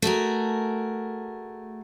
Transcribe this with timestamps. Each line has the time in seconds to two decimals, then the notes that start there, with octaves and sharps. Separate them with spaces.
0.02 A3 F#4 G#4 A#4